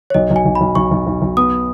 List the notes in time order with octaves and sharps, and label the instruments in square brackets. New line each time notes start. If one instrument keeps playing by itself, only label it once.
[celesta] C#5
[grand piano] B1 [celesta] D#5
[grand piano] B1
[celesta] G#5
[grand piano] B1
[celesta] B5
[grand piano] B1
[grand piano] B1 [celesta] C#6
[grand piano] B1
B1
B1
[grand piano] B3 [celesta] D#6